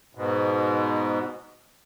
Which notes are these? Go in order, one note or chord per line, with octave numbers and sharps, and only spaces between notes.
G#2 B2